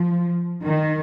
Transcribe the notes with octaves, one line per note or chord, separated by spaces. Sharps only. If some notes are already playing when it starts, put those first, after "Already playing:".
Already playing: F3
D#3